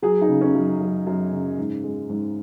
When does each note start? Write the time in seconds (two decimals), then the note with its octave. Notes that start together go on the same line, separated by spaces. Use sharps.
0.02 F#3 G#4
0.21 D#4
0.28 C#3
0.41 C#4
0.54 F#2
0.81 F#2
1.06 F#2
1.32 C#3
1.58 G#2
1.84 G#3
2.09 G#2